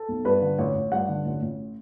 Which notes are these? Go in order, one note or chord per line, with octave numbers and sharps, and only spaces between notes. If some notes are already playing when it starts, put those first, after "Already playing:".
Already playing: A4
B1
G2 B4
D3
A1 C#5
A1
G2 F#5
D3
A1
A1